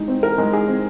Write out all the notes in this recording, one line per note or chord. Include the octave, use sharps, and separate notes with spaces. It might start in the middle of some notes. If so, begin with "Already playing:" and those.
Already playing: E3 G#3 D#4
C4
E3 A#4
G#3
D#4 G#4
C4